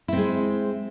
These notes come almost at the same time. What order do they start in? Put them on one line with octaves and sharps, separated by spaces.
E4 C4 G#3